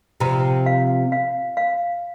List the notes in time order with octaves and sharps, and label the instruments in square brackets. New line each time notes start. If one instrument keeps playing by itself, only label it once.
[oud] C3 F3 [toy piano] A#5
[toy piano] F5
F5
F5